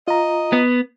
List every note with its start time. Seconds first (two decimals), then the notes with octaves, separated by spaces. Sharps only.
0.08 F4 D#5 A#5
0.53 B3